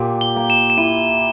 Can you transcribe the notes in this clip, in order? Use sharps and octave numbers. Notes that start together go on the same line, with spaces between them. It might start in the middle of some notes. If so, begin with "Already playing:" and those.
Already playing: A#2 G4
G7
A#3
E7
E7
E4 D#7